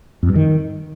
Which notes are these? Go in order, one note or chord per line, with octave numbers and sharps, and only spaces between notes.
F2
G2
D#3